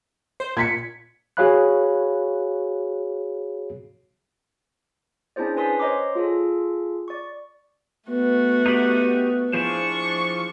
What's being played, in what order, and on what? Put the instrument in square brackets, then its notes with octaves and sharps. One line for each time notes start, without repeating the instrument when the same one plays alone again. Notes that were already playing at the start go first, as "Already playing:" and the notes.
[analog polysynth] C5
[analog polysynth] A#2 [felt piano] G#6 B6 C#7
[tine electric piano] F#4 G#4 C#5 F5 B5 F#6
[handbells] C#4 D4 E4 G#4 C5 D5
C#4 B4 G#5 C6 D#6 B6
C5 C#5 D#5 A#5 C6 D6
F4 G#4 A4
D5 C#6
[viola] A3 F#4 [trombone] B3
[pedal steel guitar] D#4 G4 F#6
[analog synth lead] F3 [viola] D4 C#6 [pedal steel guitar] E4 G#4 C5